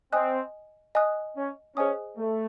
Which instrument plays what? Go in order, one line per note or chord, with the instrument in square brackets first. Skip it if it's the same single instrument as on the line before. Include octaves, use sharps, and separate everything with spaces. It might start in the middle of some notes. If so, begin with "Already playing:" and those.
[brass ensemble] C4 [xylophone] D#5 G#5 D#6 F#6
[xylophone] D#5 G#5 D#6 F#6
[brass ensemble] C#4
[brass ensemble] C#4 [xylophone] G#4 C5 D#5 G#5 D#6
[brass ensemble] A3